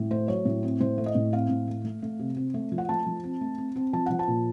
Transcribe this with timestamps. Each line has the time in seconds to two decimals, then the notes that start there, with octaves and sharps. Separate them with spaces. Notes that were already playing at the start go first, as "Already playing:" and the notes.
Already playing: A2
0.11 A3 C5
0.28 F#3 C#5
0.45 A2
0.63 C4
0.80 A2 C5
0.98 A3
1.06 D#5
1.15 A2
1.33 C4 F5
1.50 A2
1.67 A3
1.85 A3
2.02 A3
2.19 C3
2.37 C4
2.54 A3
2.72 F3
2.78 F#5
2.89 A3 A5
3.06 F3
3.24 C4
3.41 A3
3.58 C4
3.76 C4
3.93 F3 A5
4.06 F3 F#5
4.19 A5
4.28 A#2